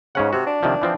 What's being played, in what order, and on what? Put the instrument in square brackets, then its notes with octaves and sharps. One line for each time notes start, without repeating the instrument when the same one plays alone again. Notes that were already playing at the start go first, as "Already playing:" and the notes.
[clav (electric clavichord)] G#2 C#4 F#5 [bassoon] C#3
[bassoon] C3 [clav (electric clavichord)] F#4
[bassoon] D4
[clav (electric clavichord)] C3 D#3 F3
E3 F3 C4